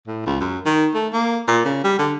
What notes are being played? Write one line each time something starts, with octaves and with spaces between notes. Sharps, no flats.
A2
C#2
F#2
D#3
A3
A#3
A#2
C#3
G3
D3